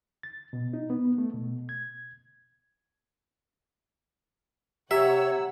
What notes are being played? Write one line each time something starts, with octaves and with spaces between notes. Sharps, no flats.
A6
B2
D#4
B3
A3
B2
G#6
C3 G4 C#5 E5 F#5 A#5 E6